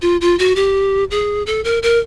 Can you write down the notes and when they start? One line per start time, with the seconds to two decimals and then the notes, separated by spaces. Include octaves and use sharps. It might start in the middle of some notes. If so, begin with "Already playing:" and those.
0.02 F4
0.21 F4
0.39 F#4
0.56 G4
1.11 G#4
1.46 A4
1.64 A#4
1.83 A#4